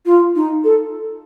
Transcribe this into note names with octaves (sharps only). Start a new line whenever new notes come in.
F4
D#4
A4